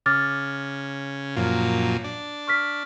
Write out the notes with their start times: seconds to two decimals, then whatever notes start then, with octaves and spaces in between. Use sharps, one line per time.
0.06 C#3 D6 F6 A6
1.36 F#2 A#2 F3
2.04 D4
2.47 C#6 F6 B6